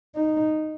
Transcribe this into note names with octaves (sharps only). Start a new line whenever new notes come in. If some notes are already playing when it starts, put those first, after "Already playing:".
D#4